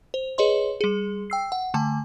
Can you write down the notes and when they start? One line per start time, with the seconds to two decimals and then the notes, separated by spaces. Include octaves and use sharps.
0.14 C5
0.38 G#4 B4 C#5 D#5 C6
0.81 G3 G#4
1.30 G5 E6 C7
1.52 F#5
1.74 D3 A3 G#5 A5